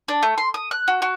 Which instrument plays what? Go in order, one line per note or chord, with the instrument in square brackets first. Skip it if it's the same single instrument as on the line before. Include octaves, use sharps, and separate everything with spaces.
[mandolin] D4
A3
C6
D#6
F#6
F#4
F#4